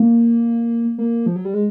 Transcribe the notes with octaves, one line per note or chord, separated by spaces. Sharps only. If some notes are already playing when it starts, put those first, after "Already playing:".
Already playing: A#3
A#3
F3
F#3
G3
G#3